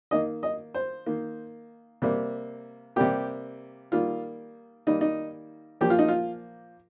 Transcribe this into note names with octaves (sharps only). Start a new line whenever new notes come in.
D#3 A#3 D#5
D#5
C5
D#3 A#3
C3 G3 A#3
C3 G3 A#3 G4
D#3 G3 A#3 F4
D#3 G3 A#3 D#4
D#4
A#2 F3 A#3 G4
F4
D#4
F4